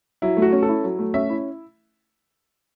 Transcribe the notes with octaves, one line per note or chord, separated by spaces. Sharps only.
F#3 E4
A3
F#4
C#4
A4
E4
F#3
A3
C#4 E5
E4